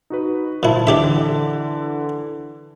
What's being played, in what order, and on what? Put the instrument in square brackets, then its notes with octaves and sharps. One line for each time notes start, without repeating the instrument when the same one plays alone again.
[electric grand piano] D#4 F#4 B4
[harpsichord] A#2 E4 [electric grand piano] C5 A5
[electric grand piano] D3 E3 [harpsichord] D4 G4 E5